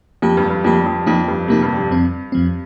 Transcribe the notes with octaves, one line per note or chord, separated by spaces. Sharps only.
F2 F3 A#3 G4
G2
G2
F2 F3 A#3 G4
F2
F2 F3 A#3 D#4
G2
C3 F3 A#3 D#4
G2
G2
F2 F3 C4
F2 F3 C4